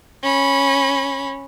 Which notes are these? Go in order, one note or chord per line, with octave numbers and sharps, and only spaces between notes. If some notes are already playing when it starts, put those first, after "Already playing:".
C#4 B5